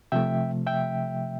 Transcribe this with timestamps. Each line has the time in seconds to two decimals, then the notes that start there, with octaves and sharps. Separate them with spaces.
0.12 C3 F3 A3 E5 G5
0.66 E5 G5